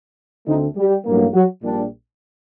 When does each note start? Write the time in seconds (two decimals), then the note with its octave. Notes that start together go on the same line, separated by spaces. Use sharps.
0.46 D2 D3 A3 C4 D#4
0.76 G3 G4
1.05 A1 G2 F#3 A#3
1.34 F#3 F#4
1.63 A#1 A#2 G3 D4